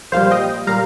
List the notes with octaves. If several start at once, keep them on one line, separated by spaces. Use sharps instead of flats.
A#1 A#2 G3 C5 F5
D#5 G5
A#2 G3 F5 A#5